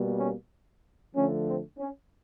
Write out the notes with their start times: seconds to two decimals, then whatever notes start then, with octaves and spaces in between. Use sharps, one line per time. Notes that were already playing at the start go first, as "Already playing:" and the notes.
Already playing: B2 G3 A#3
0.19 C#4
1.15 D3 F3 A3 C#4
1.46 C4
1.78 C#4